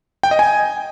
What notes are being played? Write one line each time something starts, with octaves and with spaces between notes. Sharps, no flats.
G5
D#5
G#5